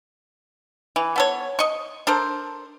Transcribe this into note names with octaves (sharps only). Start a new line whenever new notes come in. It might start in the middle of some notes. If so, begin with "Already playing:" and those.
E3
B3 A4 C#5
D#5 C#6
D4 A4 A#4 C5